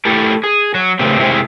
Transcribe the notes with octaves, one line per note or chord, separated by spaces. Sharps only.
A3 E4 G4 A4
G#4
F#3
C#3 A3 B3 C4 G4
C3 G#3 C4 E4 G4 G#4